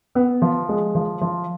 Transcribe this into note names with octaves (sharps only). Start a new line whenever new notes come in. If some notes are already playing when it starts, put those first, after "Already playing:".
B3
F3
G#3
F3
F3